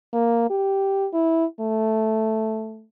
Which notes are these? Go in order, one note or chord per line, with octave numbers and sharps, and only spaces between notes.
A#3
G4
E4
A3